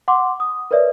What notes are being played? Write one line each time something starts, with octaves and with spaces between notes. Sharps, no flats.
F#5 C6 D6
D#6
A#4 B4 C#5 D5 E5